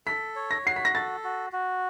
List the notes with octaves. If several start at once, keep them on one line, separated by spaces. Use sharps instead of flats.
A4 B6
C#5
A#6
F#4 C7
B6
A#6
A4 A6
F#4
F#4